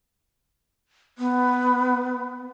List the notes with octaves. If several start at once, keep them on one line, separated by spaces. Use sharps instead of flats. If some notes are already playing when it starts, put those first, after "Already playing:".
B3